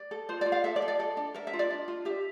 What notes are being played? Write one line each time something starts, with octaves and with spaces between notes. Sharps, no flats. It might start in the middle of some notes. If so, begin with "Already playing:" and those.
Already playing: D5
A4
F4 C5
F4 D5
F5
A4 E5
D5
A4
D5
A4
D4
A#4 E5
E5
F4
D5
D4
F4
G4 E5